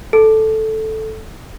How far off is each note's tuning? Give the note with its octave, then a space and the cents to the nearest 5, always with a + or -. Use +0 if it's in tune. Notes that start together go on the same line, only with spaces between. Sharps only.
A4 -5